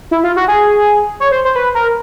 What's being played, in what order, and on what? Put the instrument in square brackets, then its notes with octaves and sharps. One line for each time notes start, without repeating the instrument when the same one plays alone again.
[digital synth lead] E4
F4
F#4
G#4
C#5
C5
C5
B4
A#4